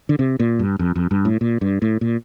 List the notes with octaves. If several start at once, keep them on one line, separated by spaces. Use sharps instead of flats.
D3
C3
A#2
G2
F2
F2
G2
A2
A#2
G2
A2
A#2